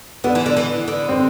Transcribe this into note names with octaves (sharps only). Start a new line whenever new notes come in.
D3 B3
E3
D3
E3
D3
C4